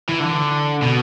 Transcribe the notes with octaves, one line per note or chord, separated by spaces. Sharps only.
E3
D3
B2